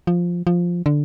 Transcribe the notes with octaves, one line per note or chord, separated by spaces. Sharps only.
F3
F3
D3